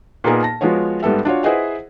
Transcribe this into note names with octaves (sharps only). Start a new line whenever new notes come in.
A#2 A#3 B3 D#4 G#4 A#4
A5 A#6
F3 G#3 B3 F4 F#4 C#5
G#2 G3 B3 A4 E5
D4 F4 F#4 C#5
E4 G#4 B4 C5 D#5 F#5